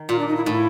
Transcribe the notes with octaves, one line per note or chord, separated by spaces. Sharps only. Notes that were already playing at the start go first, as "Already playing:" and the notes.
Already playing: D#3
A#2 F4
D4
D#4
E4
A2 D#4
E4